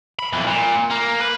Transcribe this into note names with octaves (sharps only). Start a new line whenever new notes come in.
B5
F2 E3
A#2
A#3
B4